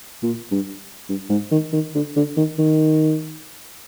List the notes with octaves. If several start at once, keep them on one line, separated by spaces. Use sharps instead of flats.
A#2
G2
G2
G#2
D#3
D#3
D3
D3
D#3
D#3